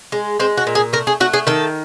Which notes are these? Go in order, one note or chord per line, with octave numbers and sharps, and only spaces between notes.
G#3
G#3 C4
F#4
A#2
G#4
A3 A#4
G#4
A3 F#4
G#4
D#3 A4